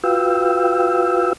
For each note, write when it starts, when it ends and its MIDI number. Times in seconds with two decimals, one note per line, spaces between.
0.04 1.33 65
0.04 1.33 66
0.04 1.33 71
0.04 1.33 77
0.04 1.33 79
0.04 1.33 88